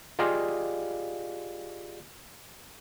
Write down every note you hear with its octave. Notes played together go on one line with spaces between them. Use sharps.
F4 G4 G#4 D5 D#5 F5